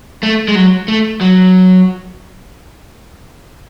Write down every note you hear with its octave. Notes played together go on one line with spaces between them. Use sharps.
A3
G#3
F#3
A3
F#3